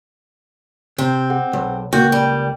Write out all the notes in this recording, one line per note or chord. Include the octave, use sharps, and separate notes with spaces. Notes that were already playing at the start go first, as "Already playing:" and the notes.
C3 C4
G#4 F#5
B1
C#2 A#3 F#4 G5 G6
G3